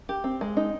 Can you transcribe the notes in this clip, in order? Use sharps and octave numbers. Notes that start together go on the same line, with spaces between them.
G4
C4
G#3
D#4